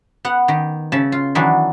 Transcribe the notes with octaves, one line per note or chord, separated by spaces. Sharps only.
B3 F#5
D#3 G4
C#3 E5 A5
F4
D#3 E3 F#3 B3 D4